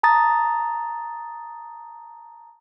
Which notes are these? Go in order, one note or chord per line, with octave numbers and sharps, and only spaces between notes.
A5 A#5 D#6 A6